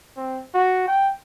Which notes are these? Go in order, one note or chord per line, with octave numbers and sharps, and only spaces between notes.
C4
F#4
G5